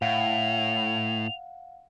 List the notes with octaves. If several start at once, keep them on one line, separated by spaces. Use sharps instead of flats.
A2 F5 F#5 F7